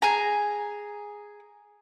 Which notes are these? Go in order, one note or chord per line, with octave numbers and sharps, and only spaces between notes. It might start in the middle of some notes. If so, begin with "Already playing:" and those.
G#4 G#5 A#5